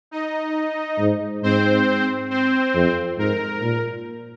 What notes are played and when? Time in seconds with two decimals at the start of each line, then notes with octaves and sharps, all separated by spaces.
0.11 D#4 D#5
0.99 G#2
1.43 G#2 C4 C5
2.31 C4 C5
2.75 F2
3.18 G#2 A#4
3.63 A#2